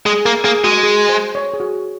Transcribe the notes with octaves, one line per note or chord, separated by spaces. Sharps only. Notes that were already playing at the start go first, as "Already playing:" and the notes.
G#3 G#4
A#3 A#4
A#3 G#4
G#3 F#4
G#4
C5
C#5
G#4
F#4